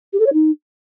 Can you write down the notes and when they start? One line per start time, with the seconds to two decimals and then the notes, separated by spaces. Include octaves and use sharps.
0.13 G4
0.19 A4
0.26 C#5
0.33 D#4